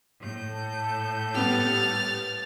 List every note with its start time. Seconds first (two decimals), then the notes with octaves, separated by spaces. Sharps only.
0.20 A2 G6
0.49 A4
1.35 G3 B3 G4 F6 A6